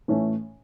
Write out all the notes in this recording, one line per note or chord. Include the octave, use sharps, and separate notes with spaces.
A2 E3 A3 C#4